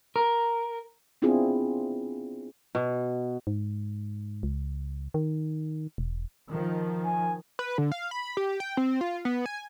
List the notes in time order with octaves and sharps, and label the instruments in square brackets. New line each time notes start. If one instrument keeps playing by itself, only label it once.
[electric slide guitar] A#4
[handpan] B3 C4 D4 E4 F4 G#4
[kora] B2
[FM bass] G#2
C#2
D#3
E1
[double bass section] D#3 F3
[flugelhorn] G#5
[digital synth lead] B4
D3
F5
B5
G4
G5
C4
F4
B3
G#5